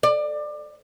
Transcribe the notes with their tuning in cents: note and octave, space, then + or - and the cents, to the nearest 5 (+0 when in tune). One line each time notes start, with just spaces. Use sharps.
D5 +25